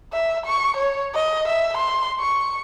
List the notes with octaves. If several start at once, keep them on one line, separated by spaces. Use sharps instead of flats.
E5
C#6
C#5
D#5
E5
C6
C#6